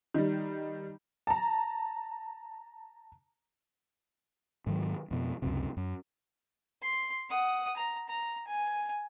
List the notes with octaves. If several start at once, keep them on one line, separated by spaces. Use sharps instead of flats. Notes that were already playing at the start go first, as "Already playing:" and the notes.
D#3 G3
A5 A#5
G#2 D#3 F#3
F2 B2
C#2 F#2 C3
F#2
C6
F#5 D#6
A#5
A#5
G#5